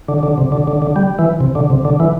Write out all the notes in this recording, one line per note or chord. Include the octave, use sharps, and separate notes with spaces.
D3
D3
C3
D3
D3
D3
G3
E3
C3
D3
C3
D3
E3